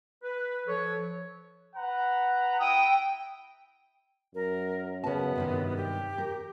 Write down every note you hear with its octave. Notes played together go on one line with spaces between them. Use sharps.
B4
F3 A4 C#5
B4 F#5 A#5
E4 G5 D#6
F#2 A#4
C#3 B3 A5
G2 C3 D#3
G4
A#4